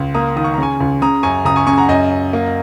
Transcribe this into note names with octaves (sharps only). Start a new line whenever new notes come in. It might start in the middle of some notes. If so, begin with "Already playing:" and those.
Already playing: C#2
A#3 A#5 D#6
D#3 D#6
C#6
A#5
C#3 G#5 C#6
C#2
C#3 A#5 D#6
F#2 G#5 C#6
C#2 A#5 D#6
G#5 C#6
C#3 G#5 C#6
F#5 A#5
F#2 D#5 G#5
F#2
A#3